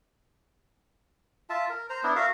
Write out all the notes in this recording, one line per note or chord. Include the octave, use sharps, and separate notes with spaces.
F4 E5 A5
A#4
C5 A#5
B3 D4 E4
F#4 A#4 E5 F5